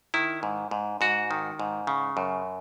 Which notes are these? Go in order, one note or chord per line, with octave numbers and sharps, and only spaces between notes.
D#3 E4
G#2
G#2
G#2 F#4
D#3
G#2
C#3
F#2